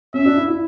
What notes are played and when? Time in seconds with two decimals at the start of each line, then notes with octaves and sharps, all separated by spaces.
0.14 C#4 E5
0.26 D4
0.37 E4
0.48 E4